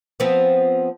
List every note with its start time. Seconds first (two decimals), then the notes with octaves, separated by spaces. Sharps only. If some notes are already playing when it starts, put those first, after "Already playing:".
0.20 F3 B3 C4